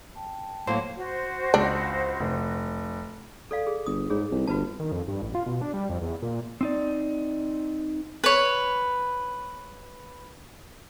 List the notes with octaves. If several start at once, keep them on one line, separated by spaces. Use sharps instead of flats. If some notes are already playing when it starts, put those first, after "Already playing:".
G5 A5
A2 F#3 A#3 C5
F#4 C5
C#2 D4
F1
A4 D5 F5
G#4
G1 D#6
G#2 G#4 C#5
C2
G1 F#4 B4 A5
D#3
F2
G2
A1
F4
B2
D4
G3
F2
E2
A#2
C4 D#4 D5
B4 C#5